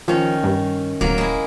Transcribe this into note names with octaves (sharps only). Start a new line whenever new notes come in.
D#3 F3 C#4
G2
D1 F#3 A#3
G#3 E4